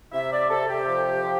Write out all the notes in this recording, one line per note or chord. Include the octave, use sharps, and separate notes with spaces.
C3 E5
D5
C3 A4
G4
F3
F3